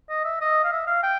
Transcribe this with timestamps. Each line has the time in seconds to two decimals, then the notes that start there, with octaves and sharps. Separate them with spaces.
0.09 D#5
0.25 E5
0.41 D#5
0.64 F5
0.72 E5
0.87 F5
1.03 G5